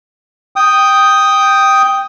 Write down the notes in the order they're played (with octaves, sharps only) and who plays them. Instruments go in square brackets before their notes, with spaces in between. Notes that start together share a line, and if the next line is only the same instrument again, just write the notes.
[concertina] G5 D#6